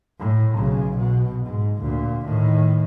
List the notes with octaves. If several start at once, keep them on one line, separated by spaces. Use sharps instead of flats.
A2
B1 C#3
B2
G#2
D2 A#2
A2 D#3